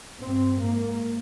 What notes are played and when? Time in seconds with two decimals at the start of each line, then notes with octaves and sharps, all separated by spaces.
0.19 G2 C4
0.59 G#2 A#3